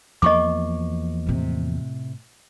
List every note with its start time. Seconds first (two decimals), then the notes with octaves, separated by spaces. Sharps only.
0.22 E2 F3 A#3 D#5 C#6 D6
1.26 A2 C3